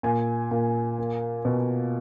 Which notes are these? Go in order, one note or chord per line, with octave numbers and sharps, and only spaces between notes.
A#2 G#5
A#2
A#3
B2